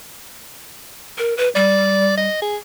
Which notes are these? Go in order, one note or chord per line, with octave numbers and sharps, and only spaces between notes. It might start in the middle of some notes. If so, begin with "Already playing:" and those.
A#4
B4
G3 D5
D#5
G#4